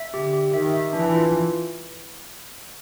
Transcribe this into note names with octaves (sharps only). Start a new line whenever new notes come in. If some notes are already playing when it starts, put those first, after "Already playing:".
Already playing: E5
D3 G4
G4
D#3 E5
E5
E3 D4
F4